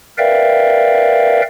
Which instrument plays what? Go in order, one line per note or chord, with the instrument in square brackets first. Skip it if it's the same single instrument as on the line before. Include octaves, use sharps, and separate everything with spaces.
[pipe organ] A#4 B4 D5 E5 F5 G5